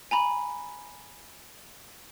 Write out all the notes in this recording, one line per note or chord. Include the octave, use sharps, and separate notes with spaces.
G#5 A#5 B5